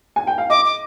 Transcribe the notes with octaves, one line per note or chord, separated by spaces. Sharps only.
G#5
G5
F5
D#5 D6
D6